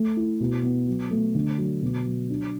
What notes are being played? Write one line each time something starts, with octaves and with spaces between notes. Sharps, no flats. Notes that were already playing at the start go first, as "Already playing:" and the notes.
Already playing: A3
E4
B2
B3
F#3
A3
D3
F#3
B2
F#3
D4